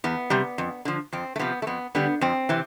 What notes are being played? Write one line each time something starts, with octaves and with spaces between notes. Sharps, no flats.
E2 B3
C3 G3
F2
D3 F3
F2 C4
A3
C3 F3 B3
A3
F2 B3
D3 G3 B3
F2 C4
C3 E3